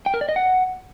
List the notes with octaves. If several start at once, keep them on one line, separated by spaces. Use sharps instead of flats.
G5
A#4
D5
D#5
F#5